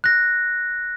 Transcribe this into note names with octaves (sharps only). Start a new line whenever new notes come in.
F#6 A#6